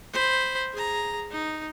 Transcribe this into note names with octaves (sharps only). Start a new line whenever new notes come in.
C5 B5
G#4 A#5
D#4